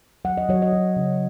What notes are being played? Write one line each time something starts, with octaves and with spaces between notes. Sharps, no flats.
F#3 F#5
D#5
F#3 C#5
D#5
F#3
C#3